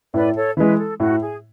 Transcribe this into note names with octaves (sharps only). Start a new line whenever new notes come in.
A2 B4 D5
A4 C#5
E3 G#3 B4
G#4
A4
A2 F#4
G#4